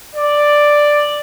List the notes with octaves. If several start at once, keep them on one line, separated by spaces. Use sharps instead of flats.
D5